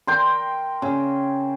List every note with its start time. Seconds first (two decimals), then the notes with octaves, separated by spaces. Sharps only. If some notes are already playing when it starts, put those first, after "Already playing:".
0.07 A#4 G5 C6
0.82 C#3